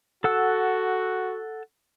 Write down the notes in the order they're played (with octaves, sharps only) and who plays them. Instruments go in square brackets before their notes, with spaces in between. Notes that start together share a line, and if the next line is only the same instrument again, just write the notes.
[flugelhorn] F#4 [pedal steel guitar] A4 F#5 E6